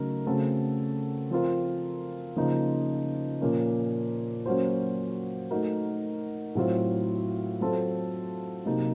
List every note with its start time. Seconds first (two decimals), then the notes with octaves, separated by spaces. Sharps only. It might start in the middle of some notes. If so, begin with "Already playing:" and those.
Already playing: C#3 F#3 A3 D#4 A#4
0.26 C#3 A3 C4 F#4 A4
1.31 F3 C4 F4 A#4
2.36 C#3 F3 A#3 D#4
3.41 A#2 F3 A#3 C#4
4.46 F#3 A#3 C#4 F#4 C5
5.51 A3 D#4 F#4 A#4
6.55 A2 F#3 C4 F4 C5
7.61 F#3 C4 F4 A4 C5
8.65 C3 F#3 A#3 D#4